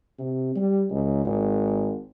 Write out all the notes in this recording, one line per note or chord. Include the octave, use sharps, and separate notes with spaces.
C3
G3
C#2
G#1